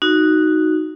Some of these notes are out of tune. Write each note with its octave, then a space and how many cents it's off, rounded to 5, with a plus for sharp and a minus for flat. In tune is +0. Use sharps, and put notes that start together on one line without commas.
D#4 +0 F#4 +0